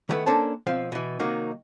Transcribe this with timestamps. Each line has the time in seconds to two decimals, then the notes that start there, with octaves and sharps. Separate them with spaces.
0.09 D#3 G3 A3 B3 E4 B4
0.26 A#3 C#4 D4 A4 C5 A5
0.67 B1 F3 C4 F5
0.92 B2 E3
1.20 C3 D#3 F#3 A#3 D#4 F#4